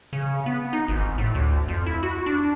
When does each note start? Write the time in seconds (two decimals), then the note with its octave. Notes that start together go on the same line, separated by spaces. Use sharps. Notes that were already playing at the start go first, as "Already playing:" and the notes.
0.13 C#3
0.46 B3
0.73 D#4
0.88 G#1
1.18 A2
1.35 D2
1.68 F2
1.86 E4
2.03 F#4
2.26 D4